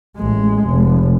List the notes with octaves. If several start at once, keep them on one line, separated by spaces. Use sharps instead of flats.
A1 G#3
F1